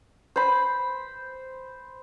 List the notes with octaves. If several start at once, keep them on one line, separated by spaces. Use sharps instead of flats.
C5 B5